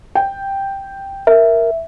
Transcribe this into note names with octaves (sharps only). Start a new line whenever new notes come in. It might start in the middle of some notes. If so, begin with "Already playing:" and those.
G5
A#4 E5